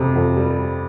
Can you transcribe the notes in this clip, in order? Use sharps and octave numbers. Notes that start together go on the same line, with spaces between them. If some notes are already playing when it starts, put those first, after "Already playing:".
Already playing: F2 C3
F2
G3